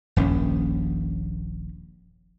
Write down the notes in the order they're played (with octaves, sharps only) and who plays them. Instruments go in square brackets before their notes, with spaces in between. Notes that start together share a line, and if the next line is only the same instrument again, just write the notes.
[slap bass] D#1 A#1 G2 C#4